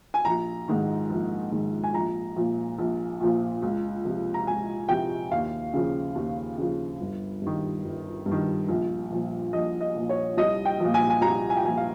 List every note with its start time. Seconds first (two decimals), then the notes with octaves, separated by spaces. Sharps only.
0.14 G#5
0.25 A#1 A#5
0.68 G#2 D#3
1.10 A#1
1.52 G#2 D#3
1.84 G#5
1.94 A#1 A#5
2.36 A#2 F3
2.78 A#1
3.21 A#2 F3
3.62 C#2
4.05 C3 F3
4.34 A#5
4.47 C#2 G#5
4.89 C3 F3 G5
5.31 D#2 F5
5.74 C#3 F3
6.15 D#2
6.58 C#3 F3
7.00 G1
7.42 G2 D#3
7.85 G1
8.26 G2
8.31 D#3
8.69 A#1
9.10 A#2 F3
9.53 A#1 D#5
9.81 D#5
9.95 A#2 F3
10.09 C#5
10.37 C2 D#5
10.65 G5
10.80 A#2 F3
10.94 G#5
11.10 G#5
11.21 C2 A#5
11.50 G#5
11.57 G5
11.64 A#2 F3 G#5
11.77 F5